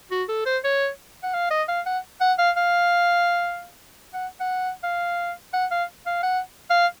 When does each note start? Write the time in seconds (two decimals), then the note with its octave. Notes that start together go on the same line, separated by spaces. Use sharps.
0.11 F#4
0.29 A4
0.45 C5
0.64 C#5
1.23 F#5
1.33 F5
1.50 D#5
1.68 F5
1.86 F#5
2.21 F#5
2.38 F5
2.56 F5
4.13 F#5
4.40 F#5
4.83 F5
5.53 F#5
5.71 F5
6.06 F5
6.23 F#5
6.70 F5